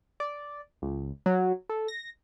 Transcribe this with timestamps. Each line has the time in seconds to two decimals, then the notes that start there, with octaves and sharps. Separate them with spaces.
0.20 D5
0.82 C#2
1.26 F#3
1.69 A4
1.88 A#6